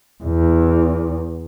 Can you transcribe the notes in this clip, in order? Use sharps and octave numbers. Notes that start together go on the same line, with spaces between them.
E2